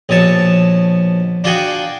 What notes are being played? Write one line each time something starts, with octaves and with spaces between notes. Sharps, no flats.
A#1 B2 C#5 A5
D4 F4 F#4 G#4 F#5 G5